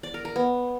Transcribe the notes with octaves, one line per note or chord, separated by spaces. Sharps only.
D5
A#4
A#4
B3